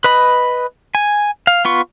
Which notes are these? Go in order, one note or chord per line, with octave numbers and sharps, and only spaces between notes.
B4 D#5 B5
G#5
F5
B3 F4 C#6